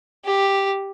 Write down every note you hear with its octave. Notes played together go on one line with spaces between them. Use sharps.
G4